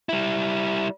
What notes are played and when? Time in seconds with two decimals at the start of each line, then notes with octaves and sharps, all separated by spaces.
0.09 G3 E4